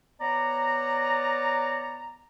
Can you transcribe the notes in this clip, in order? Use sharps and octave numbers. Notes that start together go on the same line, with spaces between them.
B3 C#5 D5 A#5